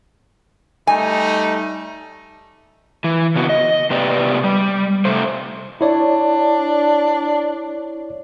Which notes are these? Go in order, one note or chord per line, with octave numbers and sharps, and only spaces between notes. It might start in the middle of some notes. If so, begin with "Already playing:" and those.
G3 A3 D#4 G#5
E3
C#3 B3 F#4
D#5
C3 B3 G4 D5
G3
C3 A3 C5
D4 E4 C#5 D5